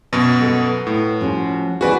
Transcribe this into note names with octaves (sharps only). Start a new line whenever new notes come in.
F#2 B2
A4 B4 F#5
A2
F3 C#4 F#4
E3 C4 F#4 G#4 B4 D5